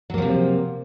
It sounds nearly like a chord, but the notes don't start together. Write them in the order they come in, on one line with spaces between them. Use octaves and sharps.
F#3 A#3 F3 C3